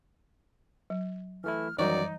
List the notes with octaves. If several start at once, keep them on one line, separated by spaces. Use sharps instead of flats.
F#3
E3 A3 E4 F6
F#2 D#3 E3 F#3 G3 D#4 D5 C#6